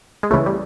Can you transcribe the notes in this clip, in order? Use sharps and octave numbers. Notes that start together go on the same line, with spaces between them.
G#3
C#2 C#3 E3 A3
G3